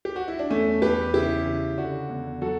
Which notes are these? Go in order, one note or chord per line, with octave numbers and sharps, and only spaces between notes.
G4
F#4
E4
D4
E2 A3 C#4
E2 G4 B4
C#3 E4 G4
C#3
D3 D4 F#4
E2
F#3 F#4 A4